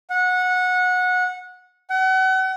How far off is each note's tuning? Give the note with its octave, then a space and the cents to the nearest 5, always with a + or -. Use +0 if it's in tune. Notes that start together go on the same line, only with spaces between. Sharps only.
F#5 -20
F#5 +35